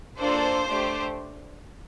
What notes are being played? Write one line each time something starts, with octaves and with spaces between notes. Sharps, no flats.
A#3 D4 F4 A4 C5
A3 D4 G4